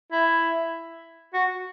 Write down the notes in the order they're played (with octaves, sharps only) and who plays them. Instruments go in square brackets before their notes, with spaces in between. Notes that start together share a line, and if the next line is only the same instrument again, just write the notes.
[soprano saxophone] E4
F#4